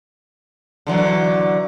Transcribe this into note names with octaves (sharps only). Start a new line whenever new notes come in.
D3 E3 F#3